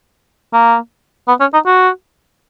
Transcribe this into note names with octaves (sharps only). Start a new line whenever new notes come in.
A#3
B3
C#4
D#4
F#4